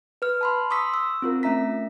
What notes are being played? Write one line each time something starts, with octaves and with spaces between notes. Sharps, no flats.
B4 F6
A5 B5 C6
C6 C#6 D#6 E6 B6
E6
C4 F4 A#4
A3 C#4 E5 A#5 B6